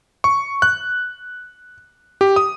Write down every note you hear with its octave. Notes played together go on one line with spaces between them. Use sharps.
C#6
F#6
G4
D#6